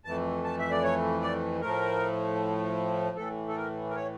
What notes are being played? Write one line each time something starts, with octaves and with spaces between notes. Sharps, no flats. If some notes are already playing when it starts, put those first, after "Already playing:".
F2 E3 A3 A5
A5
E5
D5
C#5
D5
A2 F3 A3 A#4
A2 E3 A3 A4
A4
A#4
A#4
C#5